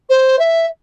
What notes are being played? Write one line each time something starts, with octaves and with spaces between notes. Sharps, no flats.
C5
E5